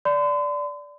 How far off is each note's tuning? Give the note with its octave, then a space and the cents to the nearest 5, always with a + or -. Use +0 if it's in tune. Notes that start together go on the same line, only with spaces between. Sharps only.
D5 -10 C6 -45